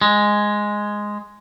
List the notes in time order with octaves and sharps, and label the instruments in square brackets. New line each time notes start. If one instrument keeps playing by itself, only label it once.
[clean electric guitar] G#3